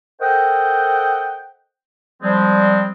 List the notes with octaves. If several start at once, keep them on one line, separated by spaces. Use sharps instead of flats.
A4 A#4 C5 D#5 F#5 G5
F3 G3 G#3 C4